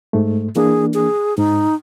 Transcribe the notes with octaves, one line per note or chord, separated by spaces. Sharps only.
G#2 A3
E3 A#3 D4 G#4
G#4
G#2 D#4